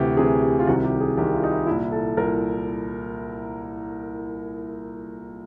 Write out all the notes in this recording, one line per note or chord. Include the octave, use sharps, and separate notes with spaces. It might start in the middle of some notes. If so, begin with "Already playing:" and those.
Already playing: D2 C3 E3 G4
D2 C3 E3 G#4
G4
F4
C2 C3 D#3 F#4
G4
G#4
C2 C3 D#3 G4
F4
D#4
E4
C2 A#2 E4
A4
C2 A#2 A#4